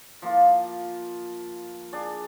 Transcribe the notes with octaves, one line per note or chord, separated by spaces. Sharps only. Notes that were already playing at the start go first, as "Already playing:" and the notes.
F3 A#3 F4
D4 G#4 D5